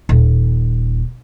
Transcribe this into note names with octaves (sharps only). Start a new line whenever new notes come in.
D#1